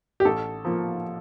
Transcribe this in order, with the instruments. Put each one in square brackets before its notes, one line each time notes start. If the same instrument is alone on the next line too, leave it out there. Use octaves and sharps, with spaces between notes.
[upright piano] G4
A1 A4
F3 A#3